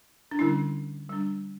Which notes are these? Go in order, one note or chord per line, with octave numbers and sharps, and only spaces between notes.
D4
D3 G3 C#4 E4
G3 D4